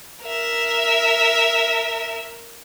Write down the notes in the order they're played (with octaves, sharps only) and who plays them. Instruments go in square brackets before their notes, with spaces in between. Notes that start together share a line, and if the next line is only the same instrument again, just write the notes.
[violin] A#4 E5